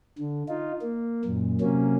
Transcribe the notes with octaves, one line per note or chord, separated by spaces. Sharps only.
D3
D#4 F4
A#3
F#2 A#2
C3 F#3 A#3 C#4